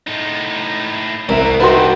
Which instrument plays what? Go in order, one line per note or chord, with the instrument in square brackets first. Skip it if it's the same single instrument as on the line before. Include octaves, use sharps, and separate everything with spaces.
[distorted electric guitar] A2 D#4
[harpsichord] C2 [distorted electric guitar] B2 [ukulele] A#4 E5
[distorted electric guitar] C4 D4 [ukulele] D#4 F#4 G4 [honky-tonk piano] B4 C6